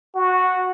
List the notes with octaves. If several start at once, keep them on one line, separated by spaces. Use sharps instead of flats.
F#4